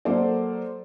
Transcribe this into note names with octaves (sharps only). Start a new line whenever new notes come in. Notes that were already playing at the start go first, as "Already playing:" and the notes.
F#3 A#3 A4 C5 D5